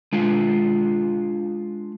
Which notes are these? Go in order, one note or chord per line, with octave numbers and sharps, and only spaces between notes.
G#3 D4 F4